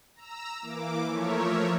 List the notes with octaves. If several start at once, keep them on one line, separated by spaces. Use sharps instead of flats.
A#5 E6
E3 A#3 D6
F3 A3 A#4 C#5 E5